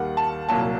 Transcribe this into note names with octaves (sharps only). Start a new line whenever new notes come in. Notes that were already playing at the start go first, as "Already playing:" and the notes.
Already playing: D#2 D#3 G3 F#5
A5
C2 A#2 F#3 A#3 A5